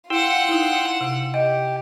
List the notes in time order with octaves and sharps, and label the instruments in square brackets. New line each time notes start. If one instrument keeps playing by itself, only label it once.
[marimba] E4 [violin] F4 F#5 [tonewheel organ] G5 C6 E6
[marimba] D#4 E4
C3
[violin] G4 [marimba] D#5 [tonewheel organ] G5